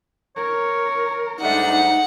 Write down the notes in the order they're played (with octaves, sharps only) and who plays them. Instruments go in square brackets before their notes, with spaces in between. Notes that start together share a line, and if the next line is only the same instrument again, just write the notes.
[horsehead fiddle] A#4 [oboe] C#5
[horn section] G#2 G3 A3 [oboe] D4 [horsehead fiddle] D#4 [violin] F#5